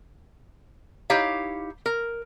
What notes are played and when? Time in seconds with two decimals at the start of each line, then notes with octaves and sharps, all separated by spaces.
1.10 D#4 E4 G4 C#5 F5
1.86 A#4